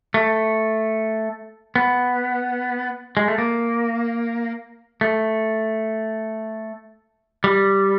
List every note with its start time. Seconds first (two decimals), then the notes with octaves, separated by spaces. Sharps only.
0.14 A3
1.76 B3
3.17 G#3
3.28 A3
3.38 A#3
5.01 A3
7.44 G3